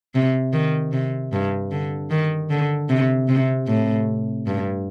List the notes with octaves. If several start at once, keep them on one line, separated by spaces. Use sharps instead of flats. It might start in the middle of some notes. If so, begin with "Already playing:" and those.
C3
D#3
C3
G2
D3
D#3
D3
C3
C3
A2
G2